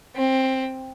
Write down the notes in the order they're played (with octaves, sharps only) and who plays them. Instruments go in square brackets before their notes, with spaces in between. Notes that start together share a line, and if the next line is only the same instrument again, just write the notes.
[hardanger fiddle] C4